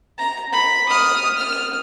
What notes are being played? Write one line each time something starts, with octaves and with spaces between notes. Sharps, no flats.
A#5
B5
D#6 F6
F6